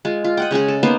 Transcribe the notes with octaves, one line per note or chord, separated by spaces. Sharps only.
G#3 F4
F4
D#5 F#5 G5
C#3 G#3 C#4 G#4
A4
A#3 B3 D#4 C5